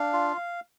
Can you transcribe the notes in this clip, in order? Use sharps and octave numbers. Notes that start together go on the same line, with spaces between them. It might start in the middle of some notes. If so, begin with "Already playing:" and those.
Already playing: D4 F5
F4